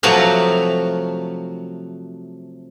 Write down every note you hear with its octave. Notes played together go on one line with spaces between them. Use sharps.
C3 F3 F#3 A3 F#4 F5